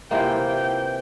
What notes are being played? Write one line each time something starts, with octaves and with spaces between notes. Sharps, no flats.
C3 E3 A#3 F4 G5